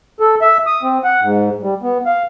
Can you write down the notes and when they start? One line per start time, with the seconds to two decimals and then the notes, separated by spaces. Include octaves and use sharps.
0.20 A4
0.42 E5
0.67 D#6
0.83 C4
1.04 F#5
1.22 G#2
1.62 G3
1.82 B3
2.06 F5